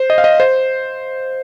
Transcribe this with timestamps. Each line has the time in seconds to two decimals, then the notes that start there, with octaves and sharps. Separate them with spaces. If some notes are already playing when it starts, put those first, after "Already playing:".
Already playing: C5
0.10 D#5
0.18 F5
0.24 D#5
0.40 C5